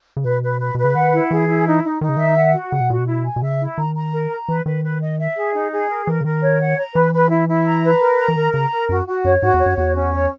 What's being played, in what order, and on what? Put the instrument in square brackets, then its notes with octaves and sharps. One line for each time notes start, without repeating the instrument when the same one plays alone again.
[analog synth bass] C#3
[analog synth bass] B2 [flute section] B4
[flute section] B4
B4
[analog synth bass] B2 [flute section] B4
[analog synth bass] C#3
[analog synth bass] D#3 [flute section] F#5
[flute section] E4
[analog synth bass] E3 [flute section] G#4
[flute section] E4
D#4
D#4
[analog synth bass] D#3 [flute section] D#4
[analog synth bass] C#3
[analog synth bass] D#3 [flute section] E5
[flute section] F#5
F#4
[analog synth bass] C#3 [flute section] F#5
[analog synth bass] B2
[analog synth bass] A#2 [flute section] F#4
[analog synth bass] B2
[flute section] E4
G#5
[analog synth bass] B2
[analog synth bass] C#3 [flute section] E5
[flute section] E4
[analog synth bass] D#3 [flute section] A#5
[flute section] A#5
A#4
A#5
[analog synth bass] E3 [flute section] B4
[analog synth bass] D#3 [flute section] B4
[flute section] B4
D#5
E5
G#4
D#4
G#4
A#4
[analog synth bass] E3 [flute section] A#4
[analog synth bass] C#3
[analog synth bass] D#3 [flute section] A#4
[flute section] C#5
F#5
A#5
[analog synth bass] E3 [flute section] B4
[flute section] B4
E4
E4
A#5
B4
A#4
A#5
[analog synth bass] E3
[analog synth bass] D#3 [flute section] A#4
[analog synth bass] C#3 [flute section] A#5
[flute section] A#4
[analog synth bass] F#2 [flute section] F#4
[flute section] F#4
[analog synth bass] F#2 [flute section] C#5
[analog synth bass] G#2 [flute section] F#4
[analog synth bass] E2
[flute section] C#5
[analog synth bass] F#2
[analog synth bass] E2 [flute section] F#4
[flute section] C#4
C#5